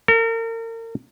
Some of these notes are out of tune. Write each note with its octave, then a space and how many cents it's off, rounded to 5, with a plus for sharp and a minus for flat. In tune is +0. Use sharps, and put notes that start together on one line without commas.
A#4 -40